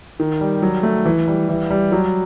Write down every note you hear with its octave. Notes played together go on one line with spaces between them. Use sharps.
D#3
G3
F#3
A3
E3
G3
E3
G3
F#3